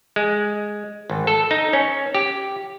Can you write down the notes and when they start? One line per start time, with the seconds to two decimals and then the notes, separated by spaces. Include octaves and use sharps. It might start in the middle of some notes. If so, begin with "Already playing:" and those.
0.16 G#3
1.10 G#1
1.27 A4
1.51 D#4
1.73 C#4
2.15 G4